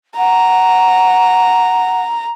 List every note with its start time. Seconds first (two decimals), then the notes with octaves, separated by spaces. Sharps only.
0.17 F#5 A#5